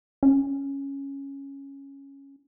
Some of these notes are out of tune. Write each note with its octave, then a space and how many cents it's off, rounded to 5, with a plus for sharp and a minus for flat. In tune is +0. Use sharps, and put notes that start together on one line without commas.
C#4 -5